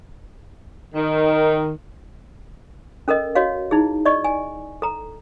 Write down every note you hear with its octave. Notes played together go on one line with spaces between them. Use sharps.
D#3
C#4 A4 A#4 D#5
F#4 C#5 D#5 F5
D#4 E4 G#4
D5 D#5 C#6
G#5
A4 A#5